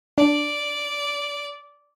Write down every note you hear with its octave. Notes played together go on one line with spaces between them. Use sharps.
D4 D5